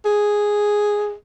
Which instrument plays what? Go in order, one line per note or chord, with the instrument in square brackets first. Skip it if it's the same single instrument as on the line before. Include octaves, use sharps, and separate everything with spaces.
[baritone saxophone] G#4